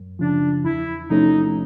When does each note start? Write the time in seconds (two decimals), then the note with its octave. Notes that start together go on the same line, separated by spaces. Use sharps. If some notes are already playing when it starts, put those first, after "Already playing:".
Already playing: F#2
0.19 C#3 F3 D4
0.64 E2 E4
1.10 C3 F3 A3 C#4 D#4